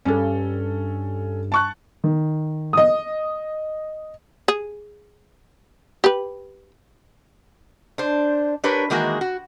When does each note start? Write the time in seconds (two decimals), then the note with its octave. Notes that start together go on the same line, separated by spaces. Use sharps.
0.05 G2 C#4 A4
1.52 A5 C#6 F#6
2.04 D#3
2.73 D#5 D#6
4.48 G#4
6.04 G4 B4
7.98 D4 C5
8.64 D4 G4 A#4 B4 C#5
8.90 D#3 E3 G#3 A#3 F#4 G#4
9.21 F#4